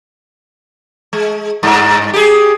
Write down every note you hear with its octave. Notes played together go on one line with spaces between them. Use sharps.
G#3
G2
G4 G#4